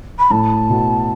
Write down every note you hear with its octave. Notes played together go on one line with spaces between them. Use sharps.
B5
A2 A5
B2